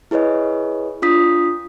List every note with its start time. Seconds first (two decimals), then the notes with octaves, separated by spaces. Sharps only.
0.11 E4 G#4 B4 C#5 D#5
1.02 D4 F4 D#6 B6